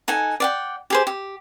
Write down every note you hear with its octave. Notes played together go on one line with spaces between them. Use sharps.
D#4 A4 F#5 G#5
D5 F#5 G5
G4 G#4 C5
G4